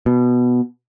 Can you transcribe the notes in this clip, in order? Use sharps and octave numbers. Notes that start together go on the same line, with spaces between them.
B2